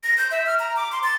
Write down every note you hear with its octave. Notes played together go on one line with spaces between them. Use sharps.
A#6
G6
E5
F6
A#5
D6
C6
A6